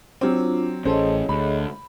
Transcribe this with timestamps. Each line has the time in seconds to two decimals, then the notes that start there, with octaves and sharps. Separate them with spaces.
0.21 F#3 C4 D4 F4
0.85 A1 C#4 G#4 A4 C5 C#5 D#5
1.29 D2 B5